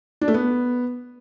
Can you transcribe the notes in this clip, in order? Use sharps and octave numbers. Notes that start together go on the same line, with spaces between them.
D4
A3
B3